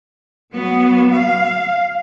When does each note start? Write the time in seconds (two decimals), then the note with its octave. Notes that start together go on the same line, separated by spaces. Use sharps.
0.52 F#3 B3
1.17 F5